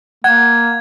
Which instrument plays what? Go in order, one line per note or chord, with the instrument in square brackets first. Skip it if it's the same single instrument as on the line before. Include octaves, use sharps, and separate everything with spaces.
[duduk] A#3 [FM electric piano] F#5 [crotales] G#6